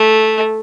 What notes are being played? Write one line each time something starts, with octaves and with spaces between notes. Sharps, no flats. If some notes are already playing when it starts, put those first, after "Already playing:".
Already playing: A3